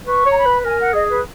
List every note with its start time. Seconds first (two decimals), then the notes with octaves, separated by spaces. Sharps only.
0.06 B4 C#6
0.26 C#5 A#5
0.36 B5
0.46 B4
0.65 A#4 G#5
0.80 F#5
0.93 G#4 D#5
1.09 B4